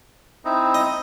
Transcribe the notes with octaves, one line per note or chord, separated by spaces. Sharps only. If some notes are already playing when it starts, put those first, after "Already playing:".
C4 D#4 E4
D#5